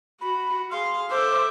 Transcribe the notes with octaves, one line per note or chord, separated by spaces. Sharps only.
F#4 B5
G#4 F5 C6
A4 C5 E5 D6